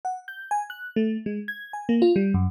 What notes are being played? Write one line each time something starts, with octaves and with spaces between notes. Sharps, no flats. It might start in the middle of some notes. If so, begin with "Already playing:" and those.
F#5
G6
G#5
F#6
A3
G#3
G#6
G#5
A#3
F4
G3
F#2